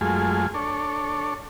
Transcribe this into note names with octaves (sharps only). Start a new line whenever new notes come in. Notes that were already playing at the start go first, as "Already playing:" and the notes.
F#2 G#3 A3 F4 G#4
D4 A4 C#5